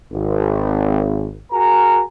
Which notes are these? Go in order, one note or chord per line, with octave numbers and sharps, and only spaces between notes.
G#1
F#4 G#4 A#4 G#5 A#5